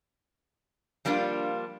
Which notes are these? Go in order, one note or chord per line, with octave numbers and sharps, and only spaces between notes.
F3 G3 A#3 D4 F4